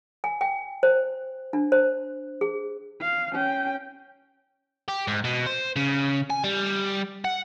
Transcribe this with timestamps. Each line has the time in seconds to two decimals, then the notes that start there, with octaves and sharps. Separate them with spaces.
0.24 G#5
0.41 G5
0.83 C5
1.53 D4
1.72 C5
2.41 G#4
3.01 F5
3.32 C#4 G5
4.88 G4
5.08 G#2
5.25 B2
5.46 C5
5.76 C#3
6.30 G#5
6.44 G3
7.25 F#5